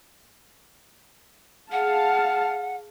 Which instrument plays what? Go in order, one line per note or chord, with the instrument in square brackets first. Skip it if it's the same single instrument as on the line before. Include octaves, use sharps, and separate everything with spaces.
[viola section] G#4 F5 A5 [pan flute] F#5